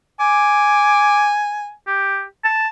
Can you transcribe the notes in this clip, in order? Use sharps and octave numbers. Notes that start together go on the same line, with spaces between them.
G#5 D6
G4
A5